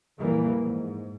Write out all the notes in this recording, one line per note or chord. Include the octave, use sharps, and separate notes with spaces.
F2 A#2 E3 G3 A#3
G#2